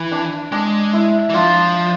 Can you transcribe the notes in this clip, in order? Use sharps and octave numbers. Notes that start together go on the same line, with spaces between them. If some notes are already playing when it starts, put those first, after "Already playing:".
Already playing: E3
D4
G#3 D4
E4
E3
F3 D4 F4